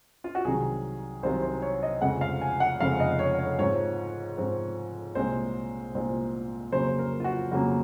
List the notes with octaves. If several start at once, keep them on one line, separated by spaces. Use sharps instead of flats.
F4
F#4
C2 C3 D#3 F#3 G#4
C2 C3 D#3 F#3 C5
C5
C#5
D#5
F1 F2 C#3 F3 G#3 F#5
F5
G#5
F#5
F1 F2 C#3 F3 G#3 F5
D#5
C#5
C#5
G#2 F3 C4 C#5
G#2 F3 C4
C2 A#2 G#3 C4 C5
C2 A#2 G#3 C4
F2 C#3 F#3 A#3 C5
A#4
F4
F#4
F2 C#3 F#3 A#3 F#4